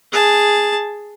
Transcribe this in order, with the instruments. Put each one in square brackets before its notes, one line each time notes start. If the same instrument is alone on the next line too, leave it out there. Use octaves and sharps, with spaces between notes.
[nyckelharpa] G#4 A5